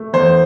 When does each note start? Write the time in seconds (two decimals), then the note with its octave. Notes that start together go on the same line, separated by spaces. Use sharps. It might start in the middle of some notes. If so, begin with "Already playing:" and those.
Already playing: A3
0.13 E2 C5